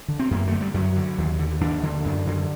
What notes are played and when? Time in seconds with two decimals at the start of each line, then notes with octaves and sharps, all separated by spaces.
0.08 D3
0.19 C4
0.31 F#2 A#3
0.48 D3 A3
0.61 G3
0.74 F#2 F#3
0.96 D3
1.18 D#2
1.39 D3
1.61 D#2 D4
1.83 D3
2.05 F#2
2.26 D3